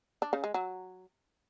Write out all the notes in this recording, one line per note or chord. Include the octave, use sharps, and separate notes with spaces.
D4
C#3
G#3
F#3